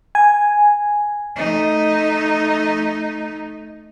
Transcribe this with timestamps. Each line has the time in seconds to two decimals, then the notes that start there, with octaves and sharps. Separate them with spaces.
0.15 G#5
1.36 A3 D#4